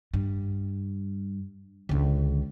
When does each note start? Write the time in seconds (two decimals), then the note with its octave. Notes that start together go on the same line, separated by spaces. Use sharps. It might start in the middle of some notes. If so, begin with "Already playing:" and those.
0.14 G2
1.89 C#2 D3